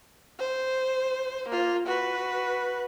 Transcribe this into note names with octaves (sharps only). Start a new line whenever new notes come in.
C5
A#3 F4
F#4 B4